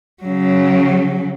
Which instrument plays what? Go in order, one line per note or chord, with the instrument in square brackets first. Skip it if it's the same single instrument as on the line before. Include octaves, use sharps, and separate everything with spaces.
[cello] C#3 F#3